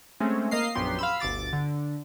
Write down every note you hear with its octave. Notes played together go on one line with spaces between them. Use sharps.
G#3 A3 C4 C#4
A#3 D#5 F5 C7
A#1 F#2 F#3 B3 G4 C6
F5 B5 E6
G1 D2 D6 A6
D3